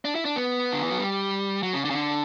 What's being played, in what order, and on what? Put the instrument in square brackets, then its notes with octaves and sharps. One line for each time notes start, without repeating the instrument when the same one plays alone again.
[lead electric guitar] D4
E4
D4
B3
D3
E3
F#3
G3
F#3
C#3
D3
C#3
D3